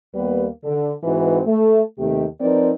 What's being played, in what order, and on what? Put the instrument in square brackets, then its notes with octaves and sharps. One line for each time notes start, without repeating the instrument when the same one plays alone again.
[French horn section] D#2 G3 A#3 B3 G4 B4
D3
G#2 E3 C4 D#4 F#4 B4
A3
D#2 C3 D#3 A3 G4
F3 C4 D#4 A#4 B4 D5